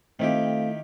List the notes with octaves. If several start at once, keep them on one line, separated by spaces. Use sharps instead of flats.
D#3 A3 C4 E4 F4 G4